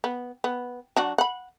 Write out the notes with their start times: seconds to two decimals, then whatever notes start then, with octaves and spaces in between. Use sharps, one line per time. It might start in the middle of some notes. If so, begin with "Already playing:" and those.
0.04 B3
0.44 B3
0.96 F#3 D4 F#4
1.18 F#5 B5